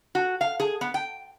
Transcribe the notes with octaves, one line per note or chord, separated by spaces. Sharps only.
F#4
F5
G#4
B3
G5